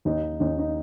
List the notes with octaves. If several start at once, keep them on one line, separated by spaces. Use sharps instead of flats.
D#2 D#4
D#2 D#4
D#4